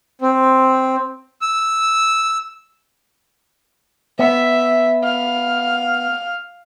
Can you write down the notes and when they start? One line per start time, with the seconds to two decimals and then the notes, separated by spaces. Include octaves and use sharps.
0.21 C4
1.41 E6
4.19 B3 E5
5.04 F5